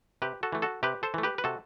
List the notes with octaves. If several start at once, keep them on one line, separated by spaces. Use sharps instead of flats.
C3 G4 B4
F#4 A4
E3 A3
F#4 A4
C3 G4 B4
A4 C5
E3 A3
G4 B4
B4
C3 F#4 A4